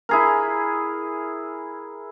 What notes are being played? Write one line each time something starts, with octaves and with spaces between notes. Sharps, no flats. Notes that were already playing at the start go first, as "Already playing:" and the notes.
E4 G#4 A#4